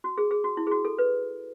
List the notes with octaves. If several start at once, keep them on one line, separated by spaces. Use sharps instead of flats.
F#4
G#4
G#4
F#4
E4
G#4
F#4
A4
B4